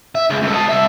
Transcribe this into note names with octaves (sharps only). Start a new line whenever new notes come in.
E5
C#2
C#2 A4
D#5 A5
C2 E5